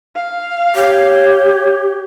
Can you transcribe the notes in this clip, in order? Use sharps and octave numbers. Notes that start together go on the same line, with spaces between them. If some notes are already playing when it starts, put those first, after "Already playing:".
F5
G4 C#5